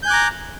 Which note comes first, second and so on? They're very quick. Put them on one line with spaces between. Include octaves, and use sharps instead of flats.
G6 G#5 F#6 D6 A#5